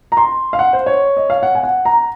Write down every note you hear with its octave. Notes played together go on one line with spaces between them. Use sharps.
A#5
C6
F5
F#5
C5
C#5
D#5
F5
F#5
G#5
F#5
A#5